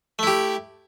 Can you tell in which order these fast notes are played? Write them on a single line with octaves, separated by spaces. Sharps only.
A3 E4 G4